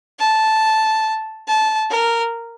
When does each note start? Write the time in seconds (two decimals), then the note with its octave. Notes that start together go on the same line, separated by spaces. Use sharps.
0.19 A5
1.48 A5
1.90 A#4